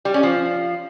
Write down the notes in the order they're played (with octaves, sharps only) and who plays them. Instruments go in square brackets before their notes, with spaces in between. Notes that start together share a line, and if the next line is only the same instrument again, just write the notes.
[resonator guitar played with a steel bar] G3
C#4
F3